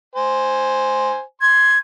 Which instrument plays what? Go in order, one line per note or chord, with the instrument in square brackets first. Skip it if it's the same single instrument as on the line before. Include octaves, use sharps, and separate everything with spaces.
[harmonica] C5 G#5
[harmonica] C6 [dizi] G#6